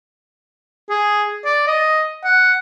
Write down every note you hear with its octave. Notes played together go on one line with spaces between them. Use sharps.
G#4
D5
D#5
F#5